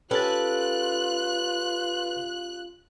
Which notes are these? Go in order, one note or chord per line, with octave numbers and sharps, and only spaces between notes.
C#4 F4 G4 A4 B4 F#6 A6